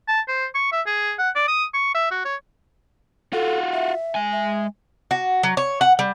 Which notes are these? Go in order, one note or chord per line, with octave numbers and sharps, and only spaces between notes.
A5
C5
C#6
E5
G#4
F#5
D5
D#6
C#6
E5
F#4
C#5
F4 F#4 A4
E5
G#3 G#5
E5
F#4
F#3
C#5
F#5
G3